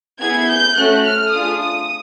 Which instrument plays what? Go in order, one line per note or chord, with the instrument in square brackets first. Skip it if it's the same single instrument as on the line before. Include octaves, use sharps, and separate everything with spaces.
[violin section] B3 E4 G#4 G#6
G6
A3 C#4 F#4 A4 F#6
F6
A3 D4 F4 G#4 D#6
D#6